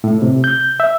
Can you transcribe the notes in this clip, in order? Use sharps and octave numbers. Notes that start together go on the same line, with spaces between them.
A2
C3
G6
E5